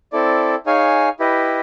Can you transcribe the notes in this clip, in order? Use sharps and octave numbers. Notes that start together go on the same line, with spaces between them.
C4 E4 A4 D5
D#4 G#4 C#5 F5 G#5
E4 G4 B4 D#5